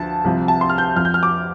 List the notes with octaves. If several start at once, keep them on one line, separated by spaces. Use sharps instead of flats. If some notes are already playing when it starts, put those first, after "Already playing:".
Already playing: D2 D3 F3 A5
C2 C3 F3
A5
C6
F6
G6
F2 F3 F6
G6
F6
D6